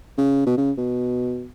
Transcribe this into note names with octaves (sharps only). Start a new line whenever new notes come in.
C#3
B2
C#3
B2